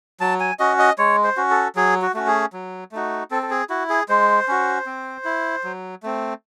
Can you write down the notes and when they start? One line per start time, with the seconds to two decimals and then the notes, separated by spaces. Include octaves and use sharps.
0.20 F#3 A5
0.40 G#5
0.59 C#4 F#4 D#5
0.79 D#5
0.98 G#3 C#5
1.24 C5
1.37 C#4 F#4
1.51 A4
1.76 F#3 G#4
2.02 F#4
2.14 A3 C#4 F#4
2.27 G#4
2.53 F#3
2.92 A3 D#4 F#4
3.31 C4 A4
3.43 A4
3.51 G#4
3.70 E4 F#4
3.90 G#4
4.09 G#3 C5
4.48 C#4 F#4
4.86 C4
5.25 E4
5.64 F#3
6.03 A3 C4